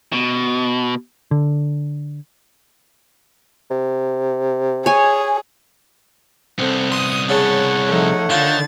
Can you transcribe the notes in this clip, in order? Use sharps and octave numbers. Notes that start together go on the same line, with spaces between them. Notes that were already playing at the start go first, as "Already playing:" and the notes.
B2
D3
C3
G#4 C#5 G#5
C2 B3 C4 A4
C6 D#6
C#3 C#5 F#5 A5
F3 A3 D#4
D3 D#3 F4 A6